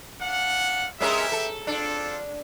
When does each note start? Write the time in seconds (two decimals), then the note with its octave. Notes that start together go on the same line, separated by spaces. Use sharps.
0.21 D4 F5 F#5
1.00 G#3 C#4 G4 A#4 B4 E5
1.32 A4
1.67 C4 D4 F4 A4